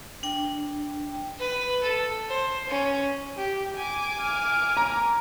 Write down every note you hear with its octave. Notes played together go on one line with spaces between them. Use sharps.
D4 G5
B4
A4
C5
C#4
G4
G#5 D6
F6
A#5